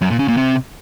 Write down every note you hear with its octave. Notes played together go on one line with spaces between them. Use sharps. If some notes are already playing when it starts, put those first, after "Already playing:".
F#2
A#2
C#3
A#2
C3